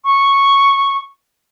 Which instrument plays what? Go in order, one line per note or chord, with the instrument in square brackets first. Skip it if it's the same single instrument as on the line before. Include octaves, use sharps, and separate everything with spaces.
[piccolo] C#6